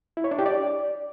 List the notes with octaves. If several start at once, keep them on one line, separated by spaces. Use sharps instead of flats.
E4
C#5
D4
G4
D5